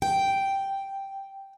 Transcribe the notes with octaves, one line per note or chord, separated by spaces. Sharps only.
G5